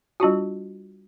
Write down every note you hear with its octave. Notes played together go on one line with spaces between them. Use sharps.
G3 D4 F4 F#4